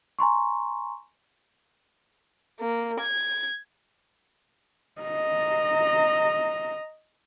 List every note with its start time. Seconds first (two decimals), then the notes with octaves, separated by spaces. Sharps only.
0.19 G#5 A#5 C6 C#6
2.60 A#3
3.00 G#6
5.02 D#5 A#5